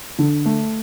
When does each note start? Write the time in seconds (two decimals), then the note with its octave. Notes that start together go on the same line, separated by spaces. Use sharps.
0.19 D3
0.46 A3